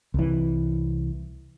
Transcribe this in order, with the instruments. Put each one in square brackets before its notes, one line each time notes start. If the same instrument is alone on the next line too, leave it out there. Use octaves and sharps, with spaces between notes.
[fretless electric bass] C2 E3